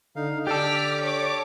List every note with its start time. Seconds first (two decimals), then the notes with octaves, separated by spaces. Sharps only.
0.16 D3 D#4 F5
0.47 D3 G4 A4 D5 D6 F6 B6
1.01 C#5 D6